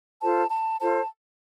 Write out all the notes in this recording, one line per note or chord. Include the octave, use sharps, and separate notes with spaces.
F4 A4 C5 A5
A5
F4 A4 C5 A5